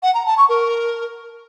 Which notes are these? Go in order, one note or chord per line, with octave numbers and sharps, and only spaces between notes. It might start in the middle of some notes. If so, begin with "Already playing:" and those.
F#5
A#5
A5
C#6
A#4